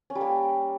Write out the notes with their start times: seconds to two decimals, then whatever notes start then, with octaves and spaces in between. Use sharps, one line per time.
0.10 C#4
0.15 G3
0.21 A#3